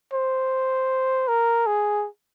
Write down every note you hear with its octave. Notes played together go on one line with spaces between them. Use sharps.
C5
A#4
G#4